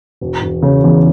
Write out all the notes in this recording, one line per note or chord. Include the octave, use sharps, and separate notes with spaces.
E1
E1
C#3
E2